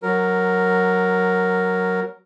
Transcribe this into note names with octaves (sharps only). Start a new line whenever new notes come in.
F#3 A#4